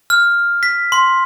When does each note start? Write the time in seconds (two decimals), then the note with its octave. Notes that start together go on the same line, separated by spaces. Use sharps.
0.10 F6
0.63 B6
0.92 C6